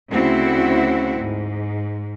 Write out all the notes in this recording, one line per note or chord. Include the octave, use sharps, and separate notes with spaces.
D2 C#3 C4 E4 F#4
G#2